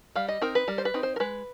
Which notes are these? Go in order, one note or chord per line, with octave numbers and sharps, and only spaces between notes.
G3 F5
D#5
C4 D#4 A#4
B4
G3 A#4
C5
B4
C4 D#4
C5
A#4
G#3 B4